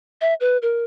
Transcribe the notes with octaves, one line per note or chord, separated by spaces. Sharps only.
E5
B4
A#4